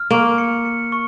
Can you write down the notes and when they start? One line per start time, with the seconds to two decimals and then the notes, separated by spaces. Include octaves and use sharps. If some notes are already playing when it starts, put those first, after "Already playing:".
Already playing: F6
0.10 A#3 C#6
0.38 C#7
0.65 C#7
0.92 C#6